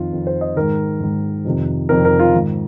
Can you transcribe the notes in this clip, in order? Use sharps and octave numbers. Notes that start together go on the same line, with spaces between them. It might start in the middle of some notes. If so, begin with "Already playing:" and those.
Already playing: F2 D#3 F4
F2 D#3
C5
D#5
G#2 D#3 A#4
G#2 D#3
F2 C3 D#3
F2 C3 D#3 A#4
A#4
F4
G#2 D#3